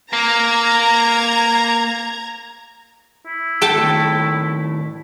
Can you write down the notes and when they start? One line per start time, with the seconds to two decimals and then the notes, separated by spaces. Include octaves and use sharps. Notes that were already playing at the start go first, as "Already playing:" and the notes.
0.13 A#3 A#5 G#6
3.26 E4
3.61 A4 G5 A5
3.75 D#2 A2